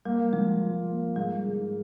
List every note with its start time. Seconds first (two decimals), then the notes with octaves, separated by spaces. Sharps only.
0.05 G3 A#3
0.33 F3 G#3
0.61 F4
0.89 A#3
1.16 G#2 G3
1.45 G#2